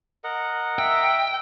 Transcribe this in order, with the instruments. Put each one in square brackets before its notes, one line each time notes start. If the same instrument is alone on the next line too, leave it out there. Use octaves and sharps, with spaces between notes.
[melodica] A#4 D#5 F#5
[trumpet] E5 [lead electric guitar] G5